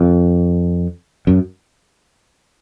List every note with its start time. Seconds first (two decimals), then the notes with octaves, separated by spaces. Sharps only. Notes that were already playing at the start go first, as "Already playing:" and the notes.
Already playing: F2
1.27 F#2